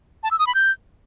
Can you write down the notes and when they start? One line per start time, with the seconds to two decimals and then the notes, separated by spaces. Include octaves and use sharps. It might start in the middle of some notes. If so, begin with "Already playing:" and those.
0.23 A5
0.31 E6
0.39 D#6
0.47 B5
0.55 G6